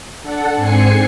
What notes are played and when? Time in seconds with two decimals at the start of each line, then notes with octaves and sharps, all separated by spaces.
0.21 D4 A4 F#5
0.56 G#2 C4 G#5 C7 C#7